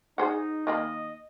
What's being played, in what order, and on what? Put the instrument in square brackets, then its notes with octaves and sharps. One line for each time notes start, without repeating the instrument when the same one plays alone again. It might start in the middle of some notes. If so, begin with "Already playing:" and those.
[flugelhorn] D#4 [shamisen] G#4 C5 F#5
[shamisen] D#3 A#3 B5 [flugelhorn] D#5